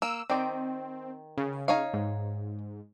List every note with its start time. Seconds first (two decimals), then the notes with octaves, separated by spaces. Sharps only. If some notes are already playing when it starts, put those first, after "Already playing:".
0.02 A#3 E6
0.30 D#3 C4 D5
1.38 C#3
1.68 D#4 C#5 F5
1.94 G#2